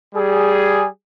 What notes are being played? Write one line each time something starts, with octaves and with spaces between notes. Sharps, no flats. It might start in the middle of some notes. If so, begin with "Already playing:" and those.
G3 G#4